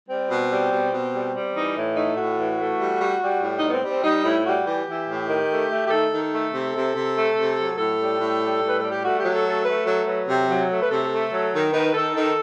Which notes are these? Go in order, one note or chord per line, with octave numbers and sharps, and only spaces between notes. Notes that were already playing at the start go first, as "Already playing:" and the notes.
G3 C4
B2
G3
B2
B2
G3
G3
E3 D#4
A2
A3 D#4
A2 F#4
E3
A3
G3
G3
G3
A2
D#4
G3 B3
C4
G3
C4
G3 D#4
A2 E4
G3 F#4
E3 G4
E3
A2
D#3
A3
A3
G4
D#3 A4
D#3
A4
A3
C3
C3
C3
A3
C3
F#3
A2 A4
G3
A2
G3
A2
B4
G3 A4
G4
A3 F#4
F#3 G4
A4
A3
A4
A3 B4
F#3 A4
F#3 B4
C3
F#3
A3
B4
C3 A4
A3
F#3
D#3
D#3 B4
D#3 A4
D#3 A4